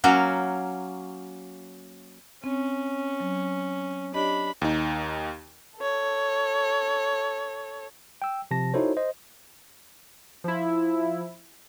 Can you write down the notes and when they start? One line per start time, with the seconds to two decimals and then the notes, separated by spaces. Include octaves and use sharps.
0.04 F#3 A#3 C#4 F#4
2.44 C4 C#4
3.20 F#3
4.14 D4 G4 C#5 D#5 B5
4.62 D#2 D#4
5.79 A4 C#5
8.22 G5 E6
8.51 C3 F3 A5 A#6
8.74 D#4 E4 F#4 A4 C5 C#5
8.97 C5 D#5
10.44 F3 E4